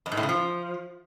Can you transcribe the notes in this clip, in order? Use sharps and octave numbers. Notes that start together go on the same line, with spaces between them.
F2
G#2
A2
C#3
F3